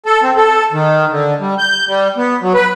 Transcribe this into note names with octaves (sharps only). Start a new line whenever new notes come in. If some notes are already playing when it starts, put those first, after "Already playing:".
A4
C4
A4
D#3
D3
G3
G6
G3
B3
F#3
B4